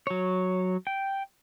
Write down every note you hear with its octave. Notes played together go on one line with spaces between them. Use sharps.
F#3 C#5
G5